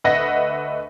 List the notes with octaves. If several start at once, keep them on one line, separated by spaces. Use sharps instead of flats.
D2 B4 D#5 E5 F#5 A#6